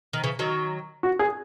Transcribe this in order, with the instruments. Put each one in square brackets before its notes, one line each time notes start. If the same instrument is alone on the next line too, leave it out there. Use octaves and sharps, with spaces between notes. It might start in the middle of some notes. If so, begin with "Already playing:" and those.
[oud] D#3
C#3 E3
D#3 F#3
[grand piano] F#4
G#4